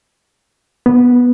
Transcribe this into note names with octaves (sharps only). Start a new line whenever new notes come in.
B3